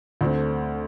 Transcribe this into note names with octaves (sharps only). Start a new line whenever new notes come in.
D2 D3 A3 C4